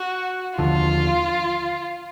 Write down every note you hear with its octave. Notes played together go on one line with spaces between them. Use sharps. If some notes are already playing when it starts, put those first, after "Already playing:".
Already playing: F#4
D#2 D3 F3 F4